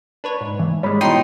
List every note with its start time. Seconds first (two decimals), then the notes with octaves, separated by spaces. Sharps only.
0.24 D4 B4 C#5
0.41 G#2
0.59 E3
0.83 G3 G#3 C#5 B5
1.01 B2 E3 F3 D#4 G5 C6